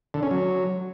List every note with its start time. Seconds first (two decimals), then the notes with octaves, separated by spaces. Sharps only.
0.14 D3
0.23 C#4
0.31 F#3